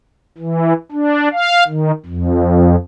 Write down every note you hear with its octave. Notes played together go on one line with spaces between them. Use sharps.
E3
D4
F5
D#3
F2